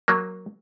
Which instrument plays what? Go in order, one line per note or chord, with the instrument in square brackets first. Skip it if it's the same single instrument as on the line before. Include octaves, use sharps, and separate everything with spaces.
[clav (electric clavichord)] F#3 A#3